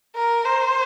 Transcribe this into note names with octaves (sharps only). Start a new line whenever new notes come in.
A#4
C5